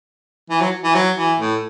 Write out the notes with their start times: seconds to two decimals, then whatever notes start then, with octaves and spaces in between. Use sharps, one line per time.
0.50 E3
0.61 F#3
0.84 E3
0.95 F#3
1.17 E3
1.39 A2